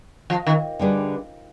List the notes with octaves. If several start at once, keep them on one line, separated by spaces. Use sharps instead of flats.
F3
D#3
D3 G3 D4 G#4 B4